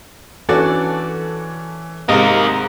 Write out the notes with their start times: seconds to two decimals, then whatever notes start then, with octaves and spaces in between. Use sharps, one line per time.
0.49 E3 C#4 D4 F#4 A4 D5
2.09 G#2 C3 A#3 D#4 A#4 D#5